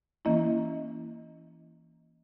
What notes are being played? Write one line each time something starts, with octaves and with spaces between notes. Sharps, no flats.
E3 A#3 C#4 E4 D#5